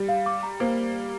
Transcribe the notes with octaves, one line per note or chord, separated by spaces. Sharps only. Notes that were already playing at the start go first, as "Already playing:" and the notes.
Already playing: G3
F5
D6
A#5
A#3 C5